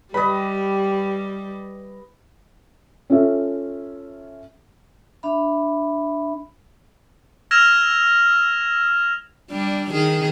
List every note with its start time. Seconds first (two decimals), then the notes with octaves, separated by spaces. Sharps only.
0.14 G3 G4 B4 D#5 B5
3.10 C#4 F4 A4 E5
5.23 D4 E5 B5
7.51 E6 F6 G#6 A#6 E7 F7
9.51 G3 D4
9.91 D#3 G#4